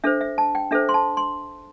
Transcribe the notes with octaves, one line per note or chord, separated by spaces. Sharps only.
D4 A4 C5 E5
E5
A5
G5
D4 A4 C5 E5
C6
A5
C6